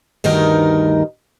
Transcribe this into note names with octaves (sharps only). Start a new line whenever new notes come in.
D2 G2 D#3 D#4 A#4